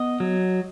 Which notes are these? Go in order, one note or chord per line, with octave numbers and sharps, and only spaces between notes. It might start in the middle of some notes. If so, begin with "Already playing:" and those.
Already playing: B3 D#5
F#3